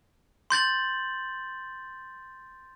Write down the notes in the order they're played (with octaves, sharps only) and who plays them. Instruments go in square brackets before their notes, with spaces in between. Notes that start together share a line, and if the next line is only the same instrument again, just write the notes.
[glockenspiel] C6 G6 A6 F#7